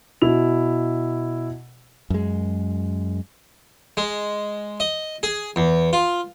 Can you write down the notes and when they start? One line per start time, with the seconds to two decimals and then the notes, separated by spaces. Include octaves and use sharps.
0.22 B2 E4 F7
2.10 F#2 G#3
3.97 G#3
4.80 D#5
5.23 G#4
5.56 E2
5.93 F4